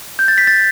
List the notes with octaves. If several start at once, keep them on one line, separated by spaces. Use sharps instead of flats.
G6
A6
B6
A6